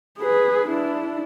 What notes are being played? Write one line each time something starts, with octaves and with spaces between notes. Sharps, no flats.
G#4 B4
D4 E4